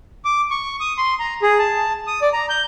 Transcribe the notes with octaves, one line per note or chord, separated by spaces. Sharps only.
D6
C#6
D#6
C6
A#5
G#4
A5
D#6
D5
A#5
G6